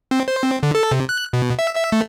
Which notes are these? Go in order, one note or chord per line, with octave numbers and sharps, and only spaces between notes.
C4
C5
C4
D3
A4
C3
F#6
B2
E5
E5
A3